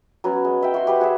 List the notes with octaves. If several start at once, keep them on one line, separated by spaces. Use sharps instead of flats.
F#3 B3 C#4
G#3
D#5 E5 G5
F#4 C6
G4 B4 C5
F#4 G#4 C#5 E5